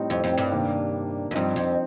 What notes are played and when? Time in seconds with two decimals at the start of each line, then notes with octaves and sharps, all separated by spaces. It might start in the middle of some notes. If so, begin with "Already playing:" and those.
Already playing: A2 G3 C4 D#4
0.10 F2
0.24 F2
0.38 G2
0.52 C3 D#3 A#3 D4
1.31 F2
1.35 G2 F3 C4 D#4
1.56 F2